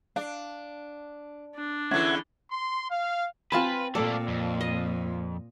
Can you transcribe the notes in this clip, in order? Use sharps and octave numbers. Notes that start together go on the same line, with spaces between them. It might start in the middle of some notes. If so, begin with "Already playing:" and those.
D4 F5
D4
E2 D3 E3 C#4 E5 F#5 G#6
C6
F5
C4 F4 B4 G#5 A5 B5
A#2 A3 A#3 A4 D5
F2
D#5